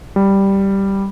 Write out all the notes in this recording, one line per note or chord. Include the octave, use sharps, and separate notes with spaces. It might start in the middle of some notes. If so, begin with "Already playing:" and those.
G3